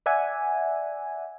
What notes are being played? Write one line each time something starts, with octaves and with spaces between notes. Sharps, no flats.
D5 E5 F#5 G#5